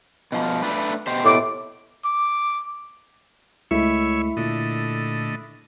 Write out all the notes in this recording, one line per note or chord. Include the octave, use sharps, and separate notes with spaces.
B2 F3
A3 D4 B4
B2 G4 C5
A2 D6
D6
C#2 G#3 A3 E4 C#5 E5 C#6
A#2 D3 A3 D#5